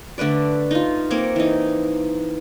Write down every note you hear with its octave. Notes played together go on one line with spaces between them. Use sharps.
D3 A3 B4 D5
D#4 F4
A#3 C4 C#5 D6
E3 D#4